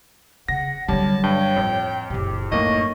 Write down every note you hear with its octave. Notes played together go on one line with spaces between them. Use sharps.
C#3 F#5 A#6
D3 F#3 G3 C#5 A5
G2 G5
A1 F2
F#1 A#2 G4
F#2 A2 A#3 D#4 D#5 C#6